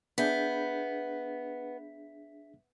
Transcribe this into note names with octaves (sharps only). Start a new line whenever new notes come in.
B3 D4 G#4 E5 G6 B6